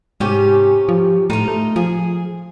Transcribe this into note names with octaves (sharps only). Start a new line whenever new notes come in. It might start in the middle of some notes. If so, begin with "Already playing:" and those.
G#2 C3 C#4 G4
F3
A2 D#4 F4
A3
F3 G#4